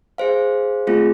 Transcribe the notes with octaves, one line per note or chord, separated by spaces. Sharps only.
G#4 C5 F5
A3 C4 F4 G#4